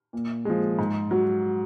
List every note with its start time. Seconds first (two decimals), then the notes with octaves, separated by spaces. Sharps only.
0.13 A#2
0.45 F3 G#3
0.79 G#2
1.11 F#3